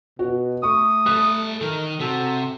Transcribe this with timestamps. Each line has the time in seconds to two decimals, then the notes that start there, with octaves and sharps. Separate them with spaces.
0.19 B2 F#4
0.63 A3 C#6 D#6
1.06 G3 A4 F#6
1.61 D#3 A#4
2.00 C3 F#4 A4